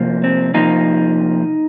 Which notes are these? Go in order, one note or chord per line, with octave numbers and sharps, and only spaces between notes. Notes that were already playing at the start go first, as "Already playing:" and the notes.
Already playing: C3 F3 A#3
C4
C3 F3 A#3 D#4